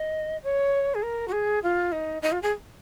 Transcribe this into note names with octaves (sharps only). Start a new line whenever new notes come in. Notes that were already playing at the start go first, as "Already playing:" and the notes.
Already playing: D#5
C#5
G#4
A#4
F#4
G#4
F4
D#4
D#4
F4
G#4